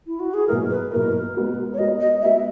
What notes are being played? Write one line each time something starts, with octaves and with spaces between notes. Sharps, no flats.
E4
F#4
G#4
B2 F#3 A#3 E4 A#4 B4
B4
B2 F#3 A#3 E4 A#4 B4
G#3 B3 F#4 A#4
C#5
G#3 B3 F#4 A#4 D#5
D#5
G#3 B3 F#4 E5